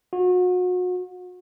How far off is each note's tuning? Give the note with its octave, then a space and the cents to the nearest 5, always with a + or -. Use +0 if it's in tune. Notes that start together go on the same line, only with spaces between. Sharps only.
F#4 -35